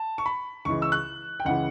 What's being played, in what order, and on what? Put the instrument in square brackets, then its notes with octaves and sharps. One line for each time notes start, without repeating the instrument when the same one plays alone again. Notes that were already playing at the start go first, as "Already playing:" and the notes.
Already playing: [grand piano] A5
C#6
B5
C#2 C#3 E3 C#6
E6
F#6
G5
C#2 C#3 E3 F#5